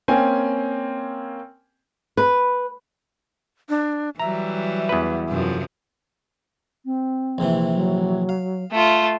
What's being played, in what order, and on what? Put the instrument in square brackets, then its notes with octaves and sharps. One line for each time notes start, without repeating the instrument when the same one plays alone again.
[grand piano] A#3 C4 C#4 G5 G#5
[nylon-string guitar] B4
[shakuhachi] D4
[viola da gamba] E3 F#3 G3 [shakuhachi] E5 [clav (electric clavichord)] A#5
[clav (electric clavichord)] E2 B4
[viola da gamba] F#2 C3 F3
[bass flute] C4
[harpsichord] A#1 C3 E3
[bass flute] F#3
[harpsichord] F5
[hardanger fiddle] A3 F4